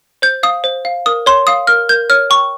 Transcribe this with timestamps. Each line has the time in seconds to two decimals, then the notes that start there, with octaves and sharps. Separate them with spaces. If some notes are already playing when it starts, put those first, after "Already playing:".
0.22 C5 G6
0.43 F5 D#6
0.64 C5
0.85 F5
1.06 A#4 D#6
1.26 C#5 C6
1.47 F5 D#6
1.67 A#4 F6
1.89 A#4 G6
2.10 C#5 F6
2.30 G5 C#6